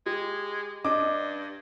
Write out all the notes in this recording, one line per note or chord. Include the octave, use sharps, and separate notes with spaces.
G#3 G4
G2 D4 D#5 D6